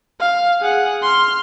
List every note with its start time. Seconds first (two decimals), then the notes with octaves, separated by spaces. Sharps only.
0.20 F5
0.62 G#4 F#5
1.02 C6 F6